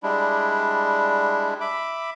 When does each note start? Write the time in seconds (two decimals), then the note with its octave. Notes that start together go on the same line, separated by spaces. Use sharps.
0.03 G3 G#3 D4 E4
1.61 E5 B5 D6